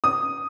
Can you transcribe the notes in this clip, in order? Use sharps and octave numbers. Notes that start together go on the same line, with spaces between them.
D#6